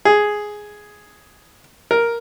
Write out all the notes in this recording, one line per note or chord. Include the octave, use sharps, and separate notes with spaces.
G#4
A#4